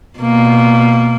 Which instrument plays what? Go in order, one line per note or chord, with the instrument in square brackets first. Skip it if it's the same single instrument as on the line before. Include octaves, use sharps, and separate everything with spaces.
[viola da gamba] B2 A#3